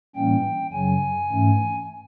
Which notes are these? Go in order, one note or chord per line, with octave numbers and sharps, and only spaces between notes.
A2 E3 G3 A#3 C#4 G5
F#2 C#3 F#3 G#5
G#2 E3 A3 C#4